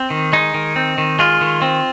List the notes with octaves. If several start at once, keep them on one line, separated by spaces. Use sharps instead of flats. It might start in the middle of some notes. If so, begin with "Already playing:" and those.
Already playing: C4
D#3
G#3 D#4
D#3
C4
D#3
G#3 F4
D#3
C4